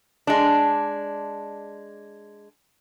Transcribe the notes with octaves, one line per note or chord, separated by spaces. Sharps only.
G#3 D4